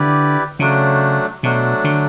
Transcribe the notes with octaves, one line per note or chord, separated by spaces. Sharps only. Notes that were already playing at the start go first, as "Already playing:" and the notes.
Already playing: D3 E4 G4 B4 D5
C#3 F#3 A3 D4
B2 F#3 A3 D4
D3